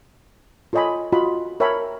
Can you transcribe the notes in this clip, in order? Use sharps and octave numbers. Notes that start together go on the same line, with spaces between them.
F4 A4 C#5 D#5 G#5 B5
F4 F#4 D#5 B5
A#4 C#5 E5 G5 A5 B5